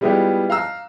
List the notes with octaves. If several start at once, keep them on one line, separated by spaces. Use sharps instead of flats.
G3 G#3 B3 E4 F4 G4
F5 A#5 E6